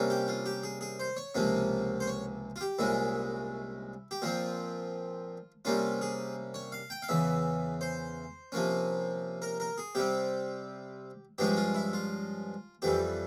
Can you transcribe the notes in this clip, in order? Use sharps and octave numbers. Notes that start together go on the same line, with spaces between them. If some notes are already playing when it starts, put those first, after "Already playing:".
Already playing: C3 G3 A#3 C#4
G4
F4
G4
G#4
G#4
C5
C#5
C#2 C3 F3 A#3 C#4
C5
C#5
F4
G4
C2 A#2 G#3 C#4 E4
G4
A#2 F3 C4 F4
C3 G3 A#3 C#4 F4
G#4
C#5
F5
G5
F5
E2 C#3 E3 E5
C5
C3 F3 A#3 C#4
A#4
A#4
G#4
C3 G3 C4 G4
G2 F3 G#3 C#4 G4
F4
E4
F4
F2 E3 G3 G4